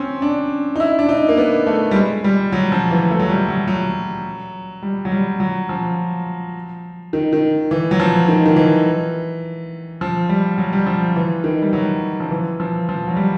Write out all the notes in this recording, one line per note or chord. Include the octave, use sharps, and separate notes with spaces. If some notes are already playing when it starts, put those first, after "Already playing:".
Already playing: C4 C#4
D4
D#4
E4
D4
D#4
A#3
B3
A3
G3
G#3
G3
F#3
F3
E3
A3
F#3
G3
F#3
F#3
G3
F#3
G3
F#3
F3
D#3
D#3
E3
F#3
F3
D#3
D#3
E3
F3
G3
F#3
G3
F3
E3
D#3
G3
F#3
F3
E3
F3
F3
F#3
G3